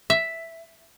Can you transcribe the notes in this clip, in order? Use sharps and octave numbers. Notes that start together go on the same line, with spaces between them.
E5